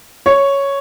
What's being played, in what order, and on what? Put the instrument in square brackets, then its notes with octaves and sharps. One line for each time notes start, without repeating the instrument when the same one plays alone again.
[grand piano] C#5